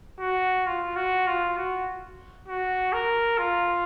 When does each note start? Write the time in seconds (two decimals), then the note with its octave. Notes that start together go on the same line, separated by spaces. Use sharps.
0.20 F#4
0.67 F4
0.96 F#4
1.27 F4
1.57 F#4
2.48 F#4
2.93 A#4
3.38 F4